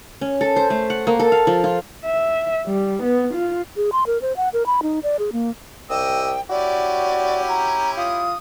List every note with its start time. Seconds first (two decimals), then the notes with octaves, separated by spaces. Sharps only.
0.21 C#4
0.41 A4
0.56 C5
0.70 A3
0.90 F#5
1.07 A#3
1.20 A4
1.32 F5
1.47 F3
1.64 F4
2.05 E5
2.67 G3
3.03 B3
3.33 F4
3.77 G#4
3.92 C6
4.07 A#4
4.22 C5
4.37 F#5
4.53 A#4
4.66 B5
4.83 D#4
5.03 D5
5.19 G#4
5.33 A#3
5.90 C2 G4 D#5 G5 E6
6.50 C#4 E4 F#4 G4 D5
7.48 A#5
7.97 F4 D#6